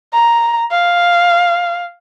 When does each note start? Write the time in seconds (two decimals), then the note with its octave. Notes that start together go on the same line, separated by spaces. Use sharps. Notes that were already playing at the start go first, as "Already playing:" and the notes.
0.14 A#5
0.71 F5